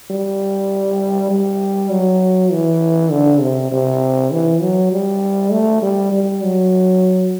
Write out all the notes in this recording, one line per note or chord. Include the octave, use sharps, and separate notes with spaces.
G3
G3
F#3
E3
D3
C3
C3
E3
F#3
G3
A3
G3
G3
F#3